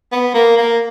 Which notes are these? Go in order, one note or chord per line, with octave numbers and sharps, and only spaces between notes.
B3
A#3
A#3